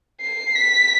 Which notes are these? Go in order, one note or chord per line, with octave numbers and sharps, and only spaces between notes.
C7
B6